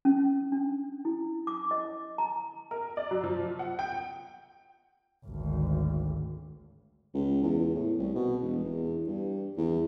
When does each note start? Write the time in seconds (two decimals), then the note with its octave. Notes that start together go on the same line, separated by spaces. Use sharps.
0.05 C#4
0.52 D4
1.05 E4
1.47 D6
1.71 D#5
2.18 A#5
2.71 A#4
2.97 D5
3.11 F#3
3.24 F3
3.59 F#5
3.79 G5
5.26 G#1 D2
7.14 C#2
7.43 E2
7.75 A2
7.99 C2
8.15 B2
8.42 E1
8.64 E2
9.07 G2
9.57 E2